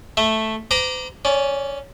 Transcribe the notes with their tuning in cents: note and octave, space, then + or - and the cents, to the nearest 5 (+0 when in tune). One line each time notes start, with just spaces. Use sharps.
A3 +0 E5 +0
C5 -45 A#5 +10 D6 +0
C#4 +0 D5 -25